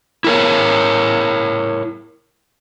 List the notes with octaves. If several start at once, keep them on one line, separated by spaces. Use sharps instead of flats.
E4 A#4 C#5